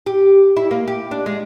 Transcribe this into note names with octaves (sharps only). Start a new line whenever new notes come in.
G4
E4
A#3
G4
D4
G#3